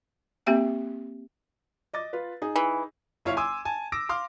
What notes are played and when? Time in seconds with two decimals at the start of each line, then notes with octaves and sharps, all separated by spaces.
0.46 A#3 C4 G4 E5 G5
1.94 D#5 D6 A6
2.13 F4 B4
2.42 D#4 G#4
2.56 E3
3.25 G1 E4 F4 C#5 F5
3.37 G#5 C6 D6 E6
3.65 G#5 A5
3.92 D6 E6 A#6 D7
4.09 F5 C6 D6 F6